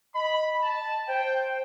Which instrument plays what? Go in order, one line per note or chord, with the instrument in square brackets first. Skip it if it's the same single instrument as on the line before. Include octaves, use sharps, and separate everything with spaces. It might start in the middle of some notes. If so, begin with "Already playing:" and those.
[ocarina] D#5 [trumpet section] B5
[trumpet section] A5
[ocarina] C5 [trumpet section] G5